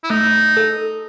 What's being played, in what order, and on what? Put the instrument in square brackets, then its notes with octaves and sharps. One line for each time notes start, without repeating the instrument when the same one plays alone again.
[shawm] E4
[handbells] A3 [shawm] D#4
[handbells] A4